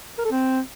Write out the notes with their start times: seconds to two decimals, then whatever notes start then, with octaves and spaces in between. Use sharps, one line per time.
0.18 A#4
0.25 A4
0.32 C4